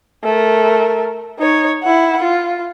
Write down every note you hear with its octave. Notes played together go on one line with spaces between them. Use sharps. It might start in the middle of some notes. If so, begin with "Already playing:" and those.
A3 A#4
D#4 C#5
E4 F#5
F4